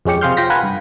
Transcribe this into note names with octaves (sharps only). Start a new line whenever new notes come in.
F2 G#3 C#4 G4 C#7
C3 F4 G#4 C6 F6 G6
F3 G5 C6 A#6 B6
F4 A#4 B4 F#5 G#5 B5
G2